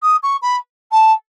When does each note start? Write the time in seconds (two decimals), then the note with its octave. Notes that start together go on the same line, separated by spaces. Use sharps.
0.03 D#6
0.23 C#6
0.42 B5
0.91 A5